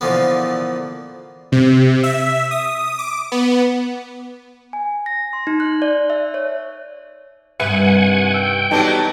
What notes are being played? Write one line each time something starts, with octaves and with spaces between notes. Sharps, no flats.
A#2 D3 E3 F3 A#3 B3
C3
E5
D#6
D6
B3
G#5
A#6
C6
D#4
F#6
D5
E5
C#5
G2 C3 D#3 B4 E5 F#5 G#5
G5 E6 F#6
E3 F#3 G3 B3 D#4 A4 A5